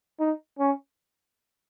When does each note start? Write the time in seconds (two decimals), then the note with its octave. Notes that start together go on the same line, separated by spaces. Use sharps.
0.20 D#4
0.59 C#4